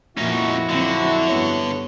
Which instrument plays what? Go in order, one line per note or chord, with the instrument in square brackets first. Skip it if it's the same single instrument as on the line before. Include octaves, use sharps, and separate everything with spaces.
[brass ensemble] F2 E4 F#4 [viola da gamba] A#2 F3 [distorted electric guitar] C#4 D#4
[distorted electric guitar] D3 [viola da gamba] F#3 C4
[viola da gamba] G2 B3 C#5